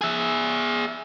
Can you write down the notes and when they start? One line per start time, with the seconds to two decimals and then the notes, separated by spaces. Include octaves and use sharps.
0.01 G#4 E5